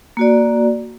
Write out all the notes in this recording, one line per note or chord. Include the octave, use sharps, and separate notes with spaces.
A#3 F#4 D5